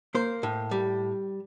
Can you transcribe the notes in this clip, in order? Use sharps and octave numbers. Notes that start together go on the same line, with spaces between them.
A#3 C5
A2
G3